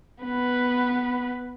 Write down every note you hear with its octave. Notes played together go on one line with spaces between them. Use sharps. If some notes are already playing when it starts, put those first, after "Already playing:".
B3 B4